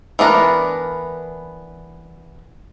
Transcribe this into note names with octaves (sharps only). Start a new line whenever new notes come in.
E3 B3 D4 A#4